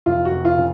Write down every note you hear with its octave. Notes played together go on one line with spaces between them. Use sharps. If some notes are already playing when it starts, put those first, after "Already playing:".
F1 F4
F#4
F1
F4
C#3